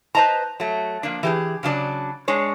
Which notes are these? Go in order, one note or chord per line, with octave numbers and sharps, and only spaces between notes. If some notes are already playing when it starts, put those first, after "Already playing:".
B4 C5 D#5 A5 A#5
F#3 A3
F3 A#3 D4
E3 G4 G#4
C#3 F#3 D4 D5
G#3 D4 C#5